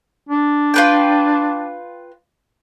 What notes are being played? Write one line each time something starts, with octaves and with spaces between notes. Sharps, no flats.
D4
F4 B4 G5